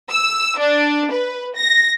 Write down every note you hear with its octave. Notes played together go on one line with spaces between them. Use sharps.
E6
D4
B4
A#6